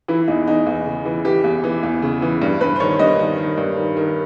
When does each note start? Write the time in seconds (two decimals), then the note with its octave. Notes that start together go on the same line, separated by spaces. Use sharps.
0.08 E3 E4
0.28 E2 D#4
0.48 E2 D#4
0.67 E2
0.86 C#3
1.05 E3
1.25 E3 G4
1.44 E2
1.64 E3
1.83 E2
2.02 C#3
2.22 E3
2.42 G2
2.61 G2 B4
2.76 C5
2.80 D#3 C#5
2.99 G2 D#5
3.19 D#3
3.38 D#3
3.58 G2
3.77 D#3
3.97 D#3